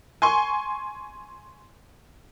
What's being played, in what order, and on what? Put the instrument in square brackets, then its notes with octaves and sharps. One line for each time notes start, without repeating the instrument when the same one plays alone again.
[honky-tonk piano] G#5 C6 C#6